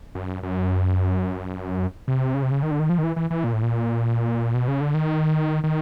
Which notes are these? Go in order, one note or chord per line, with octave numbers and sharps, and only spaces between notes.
F#2
F#2
C3
C#3
C3
C#3
D#3
D3
D#3
F3
D#3
E3
E3
E3
A#2
A2
A#2
B2
C#3
D3
D#3
D#3